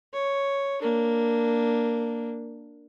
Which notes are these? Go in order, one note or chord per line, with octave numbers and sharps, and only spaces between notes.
C#5
A#3 D4